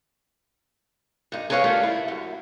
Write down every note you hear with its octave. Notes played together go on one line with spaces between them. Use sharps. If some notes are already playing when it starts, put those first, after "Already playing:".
G2 D#4
G#4 A#4 B4 C#5 D#5 F5
G3 A3 D4 F4
E4
F#2